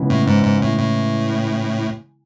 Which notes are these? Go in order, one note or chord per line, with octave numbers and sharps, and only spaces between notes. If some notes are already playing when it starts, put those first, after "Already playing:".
Already playing: C#3 E3 G#3 B3 E4
A2
G#2
G#2
A2
A2